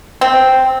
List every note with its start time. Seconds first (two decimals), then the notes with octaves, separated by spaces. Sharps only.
0.21 C4